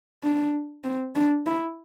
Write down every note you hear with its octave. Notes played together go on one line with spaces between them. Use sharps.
D4
C4
D4
E4